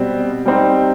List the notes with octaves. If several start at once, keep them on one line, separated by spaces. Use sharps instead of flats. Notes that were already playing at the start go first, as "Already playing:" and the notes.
Already playing: B2 G3 C4
G3 C4 D#4